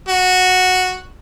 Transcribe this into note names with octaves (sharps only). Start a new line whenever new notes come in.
F#4